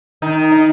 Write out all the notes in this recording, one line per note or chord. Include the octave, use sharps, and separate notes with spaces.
D#3 D#4
D#4